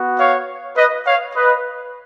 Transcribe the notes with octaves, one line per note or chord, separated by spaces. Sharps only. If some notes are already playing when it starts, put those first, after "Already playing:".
Already playing: B3 F#4
C#5 F5
B4 D#5
C#5 F5
B4 D#5